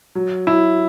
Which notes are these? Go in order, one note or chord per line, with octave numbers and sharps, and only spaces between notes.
F#3
F#3 E4